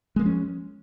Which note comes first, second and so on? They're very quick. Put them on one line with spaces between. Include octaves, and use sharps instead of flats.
G#3 A#3 F3 C#4